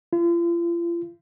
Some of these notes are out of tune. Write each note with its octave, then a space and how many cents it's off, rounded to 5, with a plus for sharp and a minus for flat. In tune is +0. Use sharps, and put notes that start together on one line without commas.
F4 -40